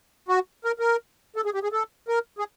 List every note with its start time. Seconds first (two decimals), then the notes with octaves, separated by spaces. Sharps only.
0.29 F#4
0.65 A#4
0.79 A#4
1.36 A4
1.45 G#4
1.54 G4
1.63 G#4
1.72 A4
2.08 A#4
2.39 G#4